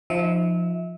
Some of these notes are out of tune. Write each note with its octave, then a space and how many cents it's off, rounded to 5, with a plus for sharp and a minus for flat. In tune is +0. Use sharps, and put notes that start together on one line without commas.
F3 +0 D#4 +0 E5 -30